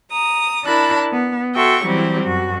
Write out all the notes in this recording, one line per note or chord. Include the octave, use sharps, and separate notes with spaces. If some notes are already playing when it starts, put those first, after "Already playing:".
A#5 D#6
D4 E4 A#4 A5 B5 F#6
B3
F#4 A4 E5 G5 C6 C#6
E3 F#3 G3 C4 E4
F#2 F#4